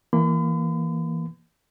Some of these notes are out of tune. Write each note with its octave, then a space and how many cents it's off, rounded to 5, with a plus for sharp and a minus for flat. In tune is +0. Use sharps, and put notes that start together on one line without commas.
E3 +0 A#3 +0 B5 +45